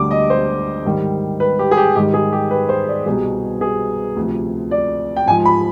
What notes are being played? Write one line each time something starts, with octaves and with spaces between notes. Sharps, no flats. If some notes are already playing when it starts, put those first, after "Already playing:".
Already playing: D2 D3 G3 D6
D#5
C5
G#2 D#3 G3
B4
G4
G#4
G4
G#2 D#3 G3 G4
G#4
G4
B4
C5
D5
C2 B2 G3 G#4
G#4
D2 C3 F3
D5
G5
G#2 F3 G#5
B5